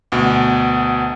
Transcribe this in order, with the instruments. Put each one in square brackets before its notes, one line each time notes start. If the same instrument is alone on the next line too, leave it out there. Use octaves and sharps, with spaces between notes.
[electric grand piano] D2 B2